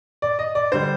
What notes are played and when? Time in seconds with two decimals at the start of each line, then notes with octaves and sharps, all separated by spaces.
0.22 D5
0.39 D#5
0.55 D5
0.72 D3 G3 C5